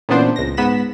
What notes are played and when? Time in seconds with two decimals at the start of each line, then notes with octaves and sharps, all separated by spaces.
0.09 A#2 C#3 E3 B3 D4 C5
0.36 C#2 A#6
0.57 G#2 B3 B5 B6 E7